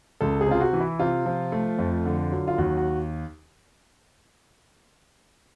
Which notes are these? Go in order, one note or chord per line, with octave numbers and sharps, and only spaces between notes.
C#2 A4
G#4
C3 F4
F#4
E3
E4
C3 F4
F3
A3
F2
D3
F#3
F4
D#2 F#4
F#4